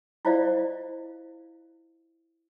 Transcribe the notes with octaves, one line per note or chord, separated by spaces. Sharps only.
E4 F4 C5 D5 D#5 F5